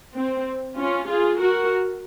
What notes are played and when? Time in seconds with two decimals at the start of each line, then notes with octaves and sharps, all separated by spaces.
0.15 C4
0.78 C#4 F4
1.09 F4 G#4
1.41 F#4 A#4